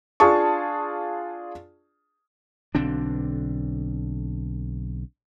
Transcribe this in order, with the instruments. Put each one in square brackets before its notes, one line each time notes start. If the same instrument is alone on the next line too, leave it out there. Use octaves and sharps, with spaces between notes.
[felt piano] D4 F4 G#4 A5 C#6
[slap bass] B1 D3 C4 D4